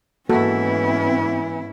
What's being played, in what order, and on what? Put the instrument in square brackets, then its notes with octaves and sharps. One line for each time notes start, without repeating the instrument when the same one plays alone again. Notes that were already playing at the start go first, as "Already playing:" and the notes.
[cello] G#2 E4 [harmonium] E3 [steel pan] A#3 F#4 A4 [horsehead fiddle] B3 C#4